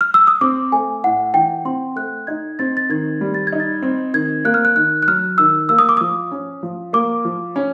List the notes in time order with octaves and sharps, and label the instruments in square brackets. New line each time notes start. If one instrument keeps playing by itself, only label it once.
[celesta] F6
E6
D#6
[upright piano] C4 [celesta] D6
[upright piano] A3 [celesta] G#5
[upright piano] A2 [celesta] F#5
[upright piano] E3 [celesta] G5
[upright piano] C4 [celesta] C6
[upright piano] A3 [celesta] F#6
[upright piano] D#4 [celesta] G#6
[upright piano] C4 [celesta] A6
[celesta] A6
[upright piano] D#3 [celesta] G#6
[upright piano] G3
[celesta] A6
G#6
[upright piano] D#4
[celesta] A6
[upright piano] C4
[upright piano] D#3 [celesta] G#6
[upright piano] A#3 [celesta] F#6
[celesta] F6
F#6
[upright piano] D#3 [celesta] F#6
[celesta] F#6
[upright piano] F#3 [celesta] F6
[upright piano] D#3 [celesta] E6
[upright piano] A#3 [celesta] E6
[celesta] D#6
D6
[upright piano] F3 [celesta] D#6
[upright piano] C#4
F3
[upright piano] A#3 [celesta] D6
[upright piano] F3
C#4